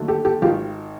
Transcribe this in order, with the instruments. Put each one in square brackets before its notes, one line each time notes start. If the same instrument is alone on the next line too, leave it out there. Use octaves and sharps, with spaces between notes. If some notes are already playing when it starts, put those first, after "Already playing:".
Already playing: [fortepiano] D#2 D3 F#3 A3
[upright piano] G4 A4
G4 A4
[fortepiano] G#1 D#3 [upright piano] F4 G4